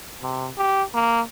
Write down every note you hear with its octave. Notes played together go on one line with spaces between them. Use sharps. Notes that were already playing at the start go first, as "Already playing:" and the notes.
C3
G4
A#3